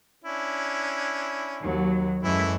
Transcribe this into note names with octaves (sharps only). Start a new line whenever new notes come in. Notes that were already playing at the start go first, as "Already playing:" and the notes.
C#4 D4 E4
D#2 F#3
F#2 E3 G#3 A3 E4